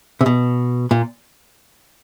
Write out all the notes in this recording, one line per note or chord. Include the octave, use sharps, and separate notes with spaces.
C3
B2
A#2